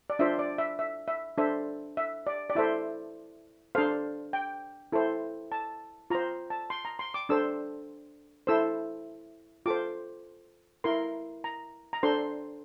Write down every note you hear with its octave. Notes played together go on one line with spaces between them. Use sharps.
D5
D4 F4 C5 E5
D5
E5
E5
E5
D4 A4 C5 E5
E5
D5
D5
E4 A4 C5 E5
D4 A4 C5 F5
G5
E4 A4 C5
A5
F4 C5 A#5
A5
C6
A#5
C6
D6
D4 A4 C5 E6
E4 A4 C5 E6
F4 A4 C5 D6
E4 A#4 C6
A#5
A#5
D4 A4 C5 C6